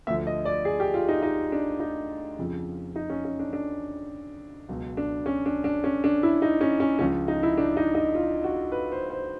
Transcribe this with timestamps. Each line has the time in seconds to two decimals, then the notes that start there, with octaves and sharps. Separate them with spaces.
0.07 D2 D3 F3 E5
0.27 D#5
0.45 D5
0.65 G#4
0.80 G4
0.94 F4
1.09 D#4
1.22 D#4
1.52 D4
1.80 D#4
2.39 F2 C#3 F3
2.96 D#4
3.10 C#4
3.25 C#4
3.39 D4
3.53 D4
4.69 C#2 B2 F#3
4.97 D4
5.26 C#4
5.46 D4
5.64 D4
5.84 C#4
6.04 D4
6.23 E4
6.42 D#4
6.61 C#4
6.80 C#4
6.99 C#2 C#3 F3 C#4
7.28 D#4
7.43 E4
7.58 D4
7.77 D#4
7.95 D#4
8.15 F4
8.44 F#4
8.72 B4
8.92 C5
9.10 C5